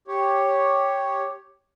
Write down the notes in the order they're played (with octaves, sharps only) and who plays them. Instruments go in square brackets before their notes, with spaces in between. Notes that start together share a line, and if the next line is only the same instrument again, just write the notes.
[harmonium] G4 C#5